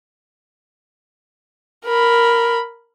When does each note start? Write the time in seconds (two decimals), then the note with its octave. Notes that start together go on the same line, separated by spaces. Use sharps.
1.85 A#4 B5